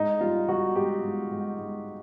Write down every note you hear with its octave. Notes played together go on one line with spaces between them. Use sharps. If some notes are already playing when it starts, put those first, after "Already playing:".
Already playing: G#2 D#4
G3 F4
G3 F#4
G#2 G4
G#2
G#2
G#2